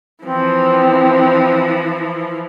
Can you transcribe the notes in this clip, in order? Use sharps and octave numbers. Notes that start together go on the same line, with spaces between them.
E3 F3 C4